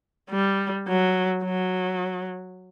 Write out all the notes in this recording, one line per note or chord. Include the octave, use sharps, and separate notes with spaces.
G3
F#3
F#3